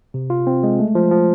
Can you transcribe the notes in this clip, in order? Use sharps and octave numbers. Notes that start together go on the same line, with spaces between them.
C3
F4
C4
G#3
A3
F3
F3